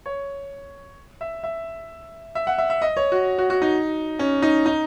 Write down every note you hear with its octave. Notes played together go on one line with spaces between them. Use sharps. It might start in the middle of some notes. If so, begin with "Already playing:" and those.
C#5
E5
E5
E5
F#5
E5
E5
D#5
C#5
F#4
F#4
F#4
D#4
C#4
D#4
D#4